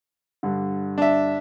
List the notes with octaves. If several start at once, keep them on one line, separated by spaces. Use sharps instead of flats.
G2 D3
D4 E5